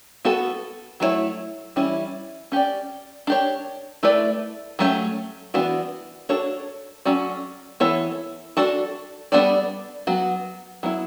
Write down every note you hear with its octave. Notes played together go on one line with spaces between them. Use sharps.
B3 F#4 A4
F#3 A3 E4 A4 C#5
E3 G3 C#4 E4
C#4 G4 D5
D4 G4 C#5
A3 E4 B4 D5
F#3 A3 C#4 G4
E3 B3 D4 F#4
D4 F#4 A4 C#5
F#3 C#4 F#4 A4 D5
E3 B3 E4 A4 C#5
D4 F#4 A4
G3 B3 D4 A4 D5
F#3 B3 F#4
F#3 B3 E4